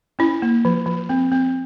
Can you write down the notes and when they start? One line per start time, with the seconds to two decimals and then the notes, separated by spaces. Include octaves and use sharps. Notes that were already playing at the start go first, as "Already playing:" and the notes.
0.19 C#4 E4
0.42 A#3
0.65 F3
0.86 F3
1.09 C4
1.32 C4